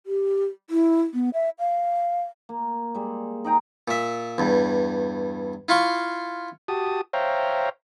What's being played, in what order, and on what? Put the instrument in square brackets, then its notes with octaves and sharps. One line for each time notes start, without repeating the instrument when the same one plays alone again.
[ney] G4
E4
B3
E5
F5
[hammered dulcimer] A#3
G3 G#3
D#4 G#4 G5 A#5
[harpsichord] A#2 E5
E2 G2
E4 F4 F5 C6 C#6
[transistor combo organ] F#4 G4 A5 D#6
C5 C#5 E5 F5 G5 A#5